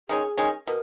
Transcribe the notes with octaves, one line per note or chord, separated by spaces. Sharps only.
D#3 G#3 C#4 G#4
D#3 G#3 C#4
B2 A#4